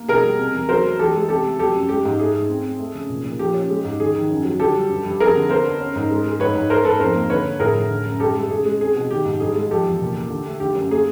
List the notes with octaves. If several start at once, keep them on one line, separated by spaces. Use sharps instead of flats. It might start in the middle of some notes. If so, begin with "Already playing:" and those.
Already playing: A#3
B2 G#4 A#4
G3
C3
E2
F#3 A#4 C5
A3
E3 G4 A4
G#3
C3 G4 A4
A3
F#3 G4 A4
F#2
G#3 G4
G#2
A3 G#4
G#2
C4
C4
A3
C#3
A#2
A#2
F3 G4
C#4
G#3
G#2
D#3 G#4
D#3
F#2
F#3
D3 G4 A4
G3
G2
G2
F2 G#4 A#4
D3
B3 A#4 C5
D4
C#4
G#2
G#3
G#3
G#2 B4 C#5
G#2
A3 A#4 C5
G#2 A4 B4
F2 A#4 C5
A#3
D3 B4 C#5
D3
A2 G#4 A#4
A2
D3
F#2
G2 G4 A4
G#3
C#3 G#4
G#3
C4 G#4
B2
D#3 G4
G#2
G2 G#4
G#3
F3 G4 A4
E2
A#2
A#2
D3
A3
D3 G4
F#2
A#3 G#4